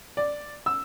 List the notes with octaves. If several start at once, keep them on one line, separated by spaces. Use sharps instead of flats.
D5
E6